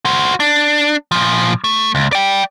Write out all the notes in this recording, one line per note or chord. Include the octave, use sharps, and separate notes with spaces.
F#4 C5
D4
A#2 F3
A3
C#2
D5 G5